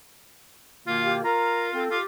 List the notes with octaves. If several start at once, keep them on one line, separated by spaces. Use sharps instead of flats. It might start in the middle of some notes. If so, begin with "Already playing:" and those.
B2 D#3 A#3 F4
G4
F4 A#4 A#5
C4 A4
F4 G4